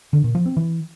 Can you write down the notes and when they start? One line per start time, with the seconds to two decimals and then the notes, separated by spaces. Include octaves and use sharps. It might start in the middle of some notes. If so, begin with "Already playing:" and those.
0.13 D3
0.24 A#2
0.35 F3
0.46 C4
0.57 E3